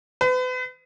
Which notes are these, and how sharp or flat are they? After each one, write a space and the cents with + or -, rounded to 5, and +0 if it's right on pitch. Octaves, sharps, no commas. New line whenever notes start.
B4 +40